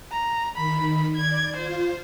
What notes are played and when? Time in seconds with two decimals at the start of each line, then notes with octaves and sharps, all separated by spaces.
0.12 A#5
0.56 D#3 B5
1.16 D5 G#6
1.56 F4 C5